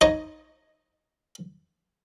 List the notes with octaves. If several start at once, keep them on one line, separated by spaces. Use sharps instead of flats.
D#4 C#5 D#5